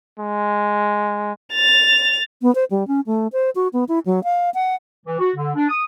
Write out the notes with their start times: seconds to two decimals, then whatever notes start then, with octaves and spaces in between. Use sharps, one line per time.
0.20 G#3
1.54 A6 F7
2.42 B3
2.55 C5
2.71 G3
2.88 C#4
3.06 A3
3.33 C5
3.55 F#4
3.73 B3
3.89 E4
4.06 F#3
4.24 F5
4.54 F#5
5.06 E3
5.19 F#4
5.36 D3
5.56 D4
5.69 D#6